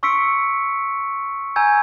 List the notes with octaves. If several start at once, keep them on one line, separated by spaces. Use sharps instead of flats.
C6 C#6 E6 B6 C#7 D7
G#5 A#5 E6 G6 G#6